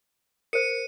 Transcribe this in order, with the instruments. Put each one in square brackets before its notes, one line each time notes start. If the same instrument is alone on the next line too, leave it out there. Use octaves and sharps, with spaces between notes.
[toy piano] A#4 C5 [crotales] C#7 D#7